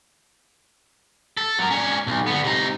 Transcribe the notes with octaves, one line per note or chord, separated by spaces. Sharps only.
A4
F#3 A#4
C#4 D4
B1
D3 B3
C3 D#4